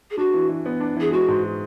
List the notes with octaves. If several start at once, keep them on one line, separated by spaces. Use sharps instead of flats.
G#4
D4 F#4
E3
E3
B3
D4
E3 G#4
G#3 F#4
G#2